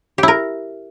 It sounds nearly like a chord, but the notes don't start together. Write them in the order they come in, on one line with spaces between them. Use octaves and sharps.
G4 E4 A#4